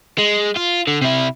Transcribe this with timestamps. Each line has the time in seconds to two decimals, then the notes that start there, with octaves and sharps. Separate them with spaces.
0.19 G#3
0.57 F4
0.87 D3
1.01 C3 E4